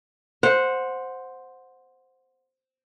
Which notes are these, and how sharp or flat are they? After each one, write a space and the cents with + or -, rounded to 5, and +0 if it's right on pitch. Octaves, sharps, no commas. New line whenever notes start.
C5 +0 F#5 -15